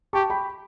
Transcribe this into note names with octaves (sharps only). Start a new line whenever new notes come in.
G4 A5 C#6
G5 B5